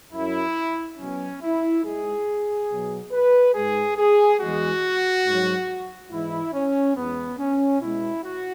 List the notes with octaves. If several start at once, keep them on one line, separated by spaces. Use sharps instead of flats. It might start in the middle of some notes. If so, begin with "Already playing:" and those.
F#2 F#3 E4
B2 F#3 C#4
E4
G#2 G#3 G#4
B2 F#3
B4
G#2 G#3 G#4
G#4
E2 E3 G#3 F#4
G#2 F#3
G#2 E3 G#3 E4
C#4
E2 E3 G#3 B3
C#4
B2 G#3 E4
F#4